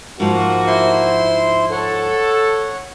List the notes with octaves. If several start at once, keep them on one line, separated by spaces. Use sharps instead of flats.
G#2 F3 A#3 F#4
E4 C5 C6
A4 C#5 F#5